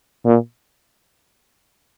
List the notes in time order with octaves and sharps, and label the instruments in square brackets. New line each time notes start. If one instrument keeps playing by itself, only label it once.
[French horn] A#2